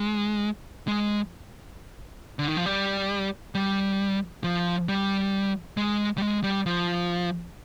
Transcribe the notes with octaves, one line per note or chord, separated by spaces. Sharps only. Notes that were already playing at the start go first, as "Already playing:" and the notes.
Already playing: G#3
G#3
D3
D#3
F3
G3
G3
F3
G3
G#3
G3
G#3
G3
F3